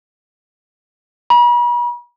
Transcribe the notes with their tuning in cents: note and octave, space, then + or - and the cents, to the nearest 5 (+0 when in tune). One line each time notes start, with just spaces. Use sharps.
B5 -45